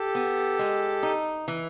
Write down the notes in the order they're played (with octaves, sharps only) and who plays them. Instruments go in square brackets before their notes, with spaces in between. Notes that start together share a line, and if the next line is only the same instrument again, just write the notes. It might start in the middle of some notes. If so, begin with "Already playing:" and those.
Already playing: [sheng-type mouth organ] G4 A4
[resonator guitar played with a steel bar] B3
G#3
D#4
E3